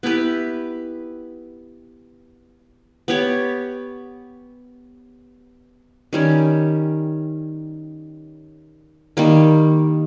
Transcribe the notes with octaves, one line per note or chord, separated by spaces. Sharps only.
B3 E4 G4 B4
B3 G4 C#5
D#3 G3 C#4
D#3 G3 A#3